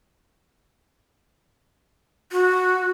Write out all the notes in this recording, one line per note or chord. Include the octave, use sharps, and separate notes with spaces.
F#4